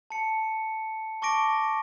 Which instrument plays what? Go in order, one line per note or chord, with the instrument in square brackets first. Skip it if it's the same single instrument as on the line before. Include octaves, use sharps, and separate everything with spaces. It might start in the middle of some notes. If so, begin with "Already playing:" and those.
[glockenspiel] A5 C#7
A5 C#6 D6 A#6 D7